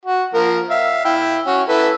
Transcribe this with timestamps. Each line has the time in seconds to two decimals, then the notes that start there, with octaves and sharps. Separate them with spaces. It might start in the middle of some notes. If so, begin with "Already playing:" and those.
0.05 F#4
0.34 F3 A#3 A#4
0.70 E5 F5
1.05 E4 G5
1.47 C#4 F#4
1.68 E4 A4 B4